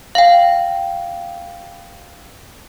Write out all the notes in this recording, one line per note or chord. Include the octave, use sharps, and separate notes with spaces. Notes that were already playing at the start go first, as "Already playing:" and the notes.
F5 G5